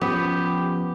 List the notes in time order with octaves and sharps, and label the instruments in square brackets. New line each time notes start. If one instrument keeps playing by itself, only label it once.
[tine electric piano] F3 C#4 [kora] B3 [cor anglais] G4